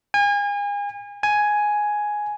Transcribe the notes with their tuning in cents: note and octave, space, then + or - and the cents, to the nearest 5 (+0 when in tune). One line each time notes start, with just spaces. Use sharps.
G#5 -35
G#5 +5